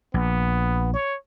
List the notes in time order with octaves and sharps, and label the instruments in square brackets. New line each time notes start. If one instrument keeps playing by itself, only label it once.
[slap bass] A#1 [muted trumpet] B3
[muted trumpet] C#5